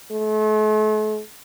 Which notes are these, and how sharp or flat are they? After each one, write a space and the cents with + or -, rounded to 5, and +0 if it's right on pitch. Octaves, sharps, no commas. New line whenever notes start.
A3 -40